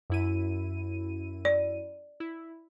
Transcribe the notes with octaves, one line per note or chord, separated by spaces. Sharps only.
F#2 E4 D#7
D5
E4